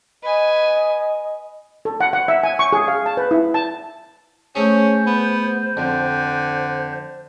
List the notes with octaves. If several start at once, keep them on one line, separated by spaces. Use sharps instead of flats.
B4 D#5 G#5
A4
F#5
F#5
E5
G#5
C#6
G#4
F5
A5
B4
E4
A5
A3 C#4 G#4 C5
B3
F2 D3